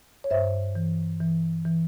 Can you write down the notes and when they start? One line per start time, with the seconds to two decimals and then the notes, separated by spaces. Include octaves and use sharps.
0.24 C#5
0.31 G2 C5 E5
0.75 E3
1.21 E3
1.65 E3